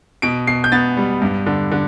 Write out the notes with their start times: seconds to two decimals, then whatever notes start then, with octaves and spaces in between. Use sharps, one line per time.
0.22 B2 D7
0.47 B2 C7
0.64 G6
0.72 B3 A6
0.97 G3
1.22 G2
1.47 D3
1.72 D3